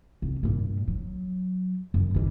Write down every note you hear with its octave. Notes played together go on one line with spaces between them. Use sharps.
C2
G2 A#2
F#3
F#2
D#3 G3